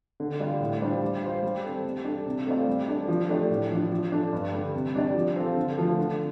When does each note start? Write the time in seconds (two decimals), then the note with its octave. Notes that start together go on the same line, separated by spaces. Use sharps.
0.20 D3
0.40 G3 F4 D5
0.60 A2
0.82 G3 D4 F4 C5
1.02 G3
1.22 F4 C5
1.43 G3
1.64 C4 A4
1.85 G3
2.05 D4 A4
2.26 C3
2.46 A3 C4 F4 D5
2.67 G3
2.88 D4 A4 D5
3.08 F3
3.29 A3 D4 G4 D5
3.50 A2
3.71 F3 D4
3.91 F3
4.12 D4 A4
4.33 G2
4.53 D3 G3
4.74 C3
4.95 G3 D4 G4 D5
5.15 F3
5.36 C4 F4 A4
5.57 D3
5.78 F3 A3 F4 A4
5.99 D3